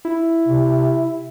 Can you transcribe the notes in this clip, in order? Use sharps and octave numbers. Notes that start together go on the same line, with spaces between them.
E4
C3